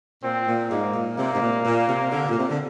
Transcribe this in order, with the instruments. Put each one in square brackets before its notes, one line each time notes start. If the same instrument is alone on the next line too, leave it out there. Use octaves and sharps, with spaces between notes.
[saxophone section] A#2 [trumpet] C4
[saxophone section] A#2
[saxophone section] G#2 [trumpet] A#3
[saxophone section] A#2
[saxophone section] C3 [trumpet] A#3
[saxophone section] G#2
A#2
A#2
C3
D3
A#2
C3
D3